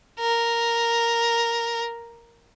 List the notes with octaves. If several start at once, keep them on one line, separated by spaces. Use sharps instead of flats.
A#4